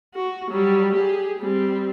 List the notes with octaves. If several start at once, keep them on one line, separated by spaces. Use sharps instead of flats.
F#4
F#3 G3
G4 G#4
G3 C4